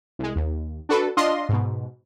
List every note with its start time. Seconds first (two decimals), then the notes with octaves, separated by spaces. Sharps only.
0.19 C2 G#3
0.36 D#2
0.89 D4 F#4 A4 B4
1.17 D4 F4 D#5 C6
1.49 G#2 B2